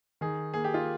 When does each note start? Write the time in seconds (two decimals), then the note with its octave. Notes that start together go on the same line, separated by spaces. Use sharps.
0.21 D#3 G#4
0.54 A#3 G#4
0.64 G4
0.74 F4